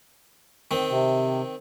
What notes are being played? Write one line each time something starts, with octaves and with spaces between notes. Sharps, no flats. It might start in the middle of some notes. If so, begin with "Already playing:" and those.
D#3 C4
C3